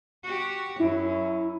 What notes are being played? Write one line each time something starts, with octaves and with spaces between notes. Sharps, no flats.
F#4 G4
F#2 E4